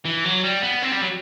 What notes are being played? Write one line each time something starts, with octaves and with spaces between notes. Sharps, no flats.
E3
F#3
G3
B3
C4
G3
F#3